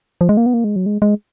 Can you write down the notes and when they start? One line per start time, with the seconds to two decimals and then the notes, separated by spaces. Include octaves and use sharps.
0.21 F3
0.29 G#3
0.37 A#3
0.46 B3
0.54 A#3
0.64 G#3
0.76 F#3
0.86 G#3
1.02 G#3